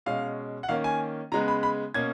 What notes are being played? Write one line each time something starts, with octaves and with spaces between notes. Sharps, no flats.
B2 G#3 C#4 F5
F#5
D#3 A#3 C#4 F5
G#5
C#3 G#3 B3 A#5
B5
B5
B2 A#3 C#4 G#6